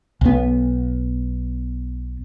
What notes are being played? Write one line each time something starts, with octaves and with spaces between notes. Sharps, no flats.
B1 B3